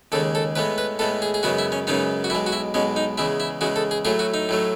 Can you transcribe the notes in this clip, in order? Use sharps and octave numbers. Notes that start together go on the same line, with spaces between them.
D#2 C#3 G#3 A4
A4
A2 G#3 B3 B4
B4
A2 G#3 B3 A4
G#4
G#4
F#2 C#3 G#3 B3 F#4
E4
C#4
F#2 C#3 G#3 B3 D#4
F#4
B1 B2 G#3 E4
F#4
E4
B1 B2 G#3 C#4
D#4
E2 C#3 G#3 E4
E4
E2 C#3 G#3 F#4
A4
G#4
A2 F#3 A3 G#4
F#4
D#4
A2 F#3 A3